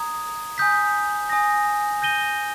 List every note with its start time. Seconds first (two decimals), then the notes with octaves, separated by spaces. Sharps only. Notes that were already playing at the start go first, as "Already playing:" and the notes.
Already playing: A#5 D#6 G#6
0.58 G#5 D#6 G6 B6
1.30 G#5 D#6 A#6
2.02 G6 A#6 D#7 G7